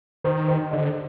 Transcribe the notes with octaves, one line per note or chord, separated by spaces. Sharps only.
D#3 C5
C5
D3 D#5